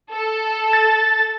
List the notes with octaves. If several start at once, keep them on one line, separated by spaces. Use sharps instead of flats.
A4
A6